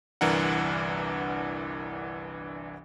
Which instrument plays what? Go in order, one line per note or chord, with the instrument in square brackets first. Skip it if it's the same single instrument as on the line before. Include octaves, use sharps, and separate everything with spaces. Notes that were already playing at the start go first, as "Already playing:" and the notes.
[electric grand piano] G1 C2 E3 D4 A#4 F#5